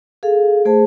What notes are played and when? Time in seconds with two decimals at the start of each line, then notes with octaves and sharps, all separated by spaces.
0.23 G#4 A4 F5
0.65 A3 G#4 C5 A5